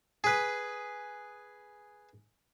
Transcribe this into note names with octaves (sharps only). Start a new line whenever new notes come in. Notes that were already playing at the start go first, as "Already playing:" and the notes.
G#4 B4